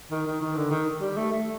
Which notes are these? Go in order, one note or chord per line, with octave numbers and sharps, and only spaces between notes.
D#3
D#3
D#3
D3
D#3
G3
A3
A3